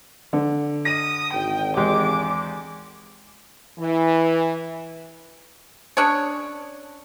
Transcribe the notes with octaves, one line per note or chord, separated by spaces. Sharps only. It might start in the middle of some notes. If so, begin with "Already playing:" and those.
D3
D#6 A#6 D#7
G#1 G5
E2 G#3 G4 D6
E3
C#4 D4 G#4 C#5